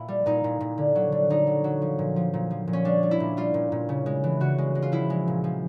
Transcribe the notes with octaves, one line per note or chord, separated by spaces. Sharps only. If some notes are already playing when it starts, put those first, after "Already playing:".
Already playing: A#2 E4
G3
A#2 D#4
A#2
A#2
D3
F#3
D3
D3 D#4
F#3
F#3
F3
A#2
F3
A#2
F3
A#2
C#4
G3 D4
G3
E4
A#2
G3 F4
A#2
A#2
C#3
G#3
E3
C#3 F#4
G#3
G#3
F4
F3 E4
G#3
A#2
F3